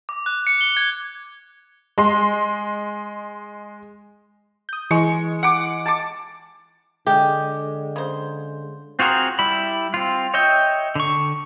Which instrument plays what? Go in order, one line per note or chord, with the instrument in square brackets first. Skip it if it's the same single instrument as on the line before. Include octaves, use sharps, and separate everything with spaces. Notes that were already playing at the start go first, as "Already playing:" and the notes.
[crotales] D6
F#6
C#7
G7
G#6
[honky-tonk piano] G#3 C6
[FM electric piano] D#6 G6
[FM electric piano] E3 [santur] G#3 C#6
[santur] F#5 D6
A5 D6
[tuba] D3 [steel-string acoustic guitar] G#3 [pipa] G4
[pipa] C#3 C5
[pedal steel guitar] C4 F4 F#4 G#4 A#4
G3 E4 B5
C4 F4
C#5 D#5 E5 G5
D3 C#6